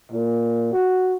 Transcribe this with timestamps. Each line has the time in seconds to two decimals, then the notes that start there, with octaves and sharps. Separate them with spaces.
0.12 A#2
0.72 F#4